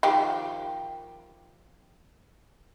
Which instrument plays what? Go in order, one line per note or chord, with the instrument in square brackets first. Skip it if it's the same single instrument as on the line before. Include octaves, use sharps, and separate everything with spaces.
[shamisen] D#3 F3 G4